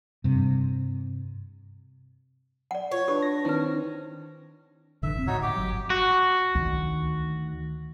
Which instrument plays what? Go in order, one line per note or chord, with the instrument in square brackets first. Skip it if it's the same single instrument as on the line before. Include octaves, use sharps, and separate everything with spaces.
[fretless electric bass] G2 C3
[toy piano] D5 F#5
[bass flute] F4 [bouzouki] C#5
[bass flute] D4 [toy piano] G4 [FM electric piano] B4
[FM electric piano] A#6
[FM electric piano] D#3 C4 [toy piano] E4 B4
[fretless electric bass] A1 D3 E3 [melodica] E5
[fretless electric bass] D#1 C#2 C4
[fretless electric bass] A2 [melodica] D#4 F#4 C#5
[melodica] G4
[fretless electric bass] G1 F#3
[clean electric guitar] F#4
[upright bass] D2 D#3